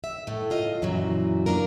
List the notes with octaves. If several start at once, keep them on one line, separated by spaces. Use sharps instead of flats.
E5
A2 A3
F#2 F4 D#5
F#2 A#2 E3 F#3
A#3 D4 F4 A#4